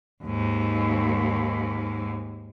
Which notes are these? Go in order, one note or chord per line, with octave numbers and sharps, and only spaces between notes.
D#2 G#2